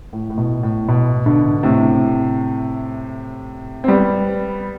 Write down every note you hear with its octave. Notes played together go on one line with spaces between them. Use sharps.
A2
A2
B2
A2
B2
B2 D3
A2 C3
C4
G3 B3